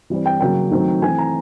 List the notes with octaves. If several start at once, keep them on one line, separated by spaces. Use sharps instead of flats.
E3 G3 C4
G5
C#3 F#3 A#3 C#4 G5
D#3 F#3 A3 C4
E3 A3 C4 G#5
A#5